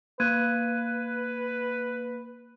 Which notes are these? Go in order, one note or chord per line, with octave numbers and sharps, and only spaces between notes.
A#3 B4 F#6 G#6 D#7